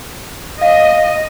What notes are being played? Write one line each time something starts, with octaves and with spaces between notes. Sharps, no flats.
D#5 F5